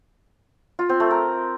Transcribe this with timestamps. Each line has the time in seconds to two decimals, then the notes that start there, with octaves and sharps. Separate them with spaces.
0.79 F4
0.89 C4
1.00 A3
1.11 A#4